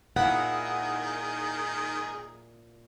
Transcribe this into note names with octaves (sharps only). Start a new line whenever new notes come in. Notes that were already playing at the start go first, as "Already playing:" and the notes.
A#2 D#3 D#4 E4 G#4 F#5 B5